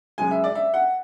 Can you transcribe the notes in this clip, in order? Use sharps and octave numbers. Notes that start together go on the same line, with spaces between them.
F#2 C#3 G#3 G#5
E5
D5
E5
F#5